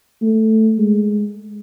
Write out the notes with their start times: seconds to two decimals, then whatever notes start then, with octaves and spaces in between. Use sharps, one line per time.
0.22 A3
0.78 G#3